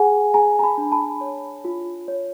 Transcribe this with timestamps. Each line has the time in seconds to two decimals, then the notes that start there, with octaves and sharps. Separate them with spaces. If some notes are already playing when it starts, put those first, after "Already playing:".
Already playing: G#4 F#5 G#5
0.34 G#4 G#5 A#5
0.59 A#5
0.62 A5 B5
0.78 D4
0.92 A5 B5
1.21 C#5
1.65 F4
2.08 C#5